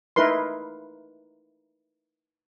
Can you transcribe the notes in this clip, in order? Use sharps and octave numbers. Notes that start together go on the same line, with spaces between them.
D#4 E4 A#4 B4 C6